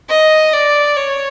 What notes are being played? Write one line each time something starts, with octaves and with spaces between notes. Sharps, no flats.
D#5
D5
C#5